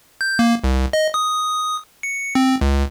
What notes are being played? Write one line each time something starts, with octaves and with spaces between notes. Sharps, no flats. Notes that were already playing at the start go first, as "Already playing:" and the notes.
G6
A#3
C2
D#5
D#6
C#7
C4
C#2